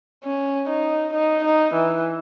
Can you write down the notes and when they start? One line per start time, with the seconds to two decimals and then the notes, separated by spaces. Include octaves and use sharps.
0.24 C#4
0.70 D#4
1.14 D#4
1.45 D#4
1.74 E3